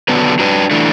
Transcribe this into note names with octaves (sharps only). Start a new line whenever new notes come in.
D3 F#3 B3 D4 B4
F#3 D4 B4
E3 A3 D4